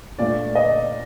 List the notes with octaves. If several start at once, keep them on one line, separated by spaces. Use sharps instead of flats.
A#2 A3 D4 D5
D#5